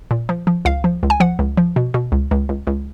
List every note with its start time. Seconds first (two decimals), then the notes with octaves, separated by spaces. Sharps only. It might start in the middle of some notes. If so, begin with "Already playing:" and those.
0.11 A#2
0.29 F3
0.47 F3
0.65 C#2 F5
0.84 F3
1.03 C#2
1.10 G#5
1.20 F3 F#5
1.39 C#2
1.57 F3
1.76 B2
1.94 B2
2.12 C#2
2.31 C#2
2.49 C#2
2.67 C#2